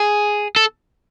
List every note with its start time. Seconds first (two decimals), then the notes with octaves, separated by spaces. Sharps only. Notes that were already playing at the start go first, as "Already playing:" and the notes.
Already playing: G#4
0.56 A4